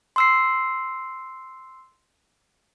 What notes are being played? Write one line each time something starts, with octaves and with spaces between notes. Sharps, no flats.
C6 E6 C7